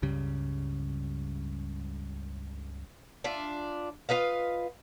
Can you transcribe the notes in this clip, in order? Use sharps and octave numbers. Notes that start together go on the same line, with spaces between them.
C#2 G2 C#3 G3
D4 F4 E5
F4 B4 D#5 F5